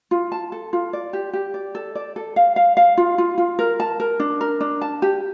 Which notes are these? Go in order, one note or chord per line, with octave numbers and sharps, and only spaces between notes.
F4
A5
A4
F4
D5
G4
G4
D5
A4
D5
A4
F5
F5
F5
F4
F4
F4
A#4
A5
A#4
D4
A#4
D4
A5
G4